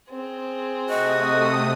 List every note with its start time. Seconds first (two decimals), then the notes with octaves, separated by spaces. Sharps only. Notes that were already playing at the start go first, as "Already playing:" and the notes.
0.10 C4 G#4
0.89 C3 A3 F#4 D#5 D#6